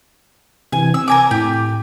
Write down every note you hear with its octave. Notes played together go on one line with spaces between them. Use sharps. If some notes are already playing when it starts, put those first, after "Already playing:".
C3 E3 G#5
C4 E6
A#4 G#5 D6
A2 G4